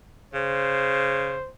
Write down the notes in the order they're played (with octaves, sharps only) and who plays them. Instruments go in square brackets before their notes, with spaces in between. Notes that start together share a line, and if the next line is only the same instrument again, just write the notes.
[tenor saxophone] C#3 [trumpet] C5